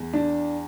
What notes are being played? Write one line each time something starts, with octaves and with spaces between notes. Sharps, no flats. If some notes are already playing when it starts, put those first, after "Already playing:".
Already playing: E2
D4